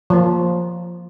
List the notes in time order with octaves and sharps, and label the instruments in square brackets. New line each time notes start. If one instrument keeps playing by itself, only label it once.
[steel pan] F3 A#3